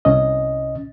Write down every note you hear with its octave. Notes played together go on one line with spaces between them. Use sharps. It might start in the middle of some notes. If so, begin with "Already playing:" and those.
C2 C#4 D#5